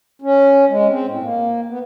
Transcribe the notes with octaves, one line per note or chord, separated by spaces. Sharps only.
C#4
G#3
C4
A2
A#3
B3